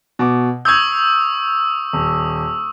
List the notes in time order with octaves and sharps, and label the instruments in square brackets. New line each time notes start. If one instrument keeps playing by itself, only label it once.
[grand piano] B2 D6
[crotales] C#6 D#6 E6 [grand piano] G6 G#6
[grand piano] D#1